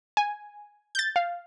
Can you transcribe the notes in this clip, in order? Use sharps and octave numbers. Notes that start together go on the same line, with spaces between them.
G#5
G6 A6
F5